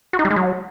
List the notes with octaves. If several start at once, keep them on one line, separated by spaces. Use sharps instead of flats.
F#4
D#4
G3
G#3
F#3